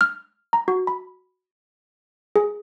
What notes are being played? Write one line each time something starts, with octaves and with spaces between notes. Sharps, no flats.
F6
A#5
F#4
B5
G#4